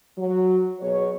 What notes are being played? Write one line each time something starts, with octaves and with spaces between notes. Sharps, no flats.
F#3
B2 F#3 G#4 C#5